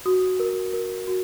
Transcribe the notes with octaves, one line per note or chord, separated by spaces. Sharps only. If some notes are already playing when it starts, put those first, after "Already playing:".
F#4 D#6
A#4
A#4
F#4